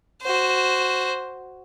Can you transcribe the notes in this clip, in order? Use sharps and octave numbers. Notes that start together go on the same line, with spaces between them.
F#4 C5